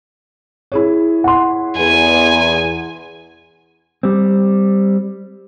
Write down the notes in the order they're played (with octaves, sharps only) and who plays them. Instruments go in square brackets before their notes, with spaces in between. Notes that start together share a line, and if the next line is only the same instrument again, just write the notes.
[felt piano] E4 G#4 C#5
[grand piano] F#5 C6
[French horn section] E2 [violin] G#5
[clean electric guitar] G3 C4